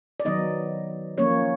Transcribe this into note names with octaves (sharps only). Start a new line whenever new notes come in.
D5
D#3 F#3 B3 D#4 D#5
F3 A#3 C#4 C#5